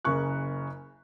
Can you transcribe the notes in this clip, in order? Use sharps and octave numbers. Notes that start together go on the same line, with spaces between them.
F#1 C#3 A#3 C#6 F#6